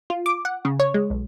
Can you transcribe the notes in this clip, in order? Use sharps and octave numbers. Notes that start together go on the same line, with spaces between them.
F4
D6
F#5
C#3
C#5
G#3
B1